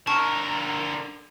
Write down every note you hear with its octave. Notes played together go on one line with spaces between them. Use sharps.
D3 A#4 A5 C#6